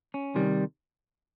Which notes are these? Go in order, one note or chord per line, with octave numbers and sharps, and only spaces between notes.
C#4
C3 D#3 G3